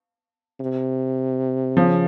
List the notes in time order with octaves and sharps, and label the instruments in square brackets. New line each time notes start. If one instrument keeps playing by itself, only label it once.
[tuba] C3
[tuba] C#3 [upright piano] F3